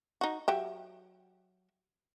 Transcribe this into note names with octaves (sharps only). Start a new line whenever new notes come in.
D#4 F#4
F#3 G4 E5